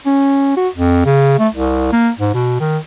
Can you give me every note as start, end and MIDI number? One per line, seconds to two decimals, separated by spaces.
0.06 0.56 61
0.57 0.68 66
0.75 1.04 41
1.06 1.38 49
1.38 1.48 57
1.54 1.91 36
1.92 2.10 58
2.19 2.34 44
2.35 2.56 47
2.60 2.78 51